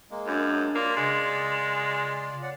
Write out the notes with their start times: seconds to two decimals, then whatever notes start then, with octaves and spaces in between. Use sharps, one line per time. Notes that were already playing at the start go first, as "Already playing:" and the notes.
0.11 G#3 A#3
0.26 F#2 D4
0.75 A#3 F4 D5
0.97 C#3 G#3
2.43 C#5 D5 F#5